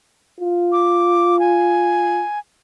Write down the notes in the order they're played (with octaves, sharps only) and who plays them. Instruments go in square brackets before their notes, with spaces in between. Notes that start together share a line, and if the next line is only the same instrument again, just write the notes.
[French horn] F4
[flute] D6
G#5